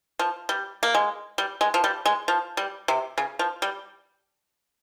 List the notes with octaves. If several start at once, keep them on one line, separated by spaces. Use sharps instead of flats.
F3
G3
A#3
G#3
G3
G#3
F3
G3
G#3
F3
G3
C3
C#3
F3
G3